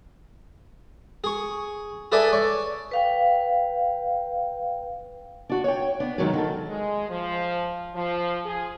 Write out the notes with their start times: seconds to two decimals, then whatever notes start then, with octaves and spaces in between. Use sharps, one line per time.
1.24 G#4 C#6
2.12 G#4 A4 B4 D5 E5 G#5
2.33 C#5 D5
2.91 B4 F5 G5
5.49 D4 F#4
5.64 C#5 G5
6.00 B3 D4
6.18 F#2 D#3 F#3 G#3
6.33 D#3 F#4 A4
6.67 G#3
7.08 F3
7.94 F3
8.45 G#4